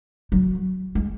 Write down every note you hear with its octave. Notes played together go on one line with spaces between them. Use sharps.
F#3
G#3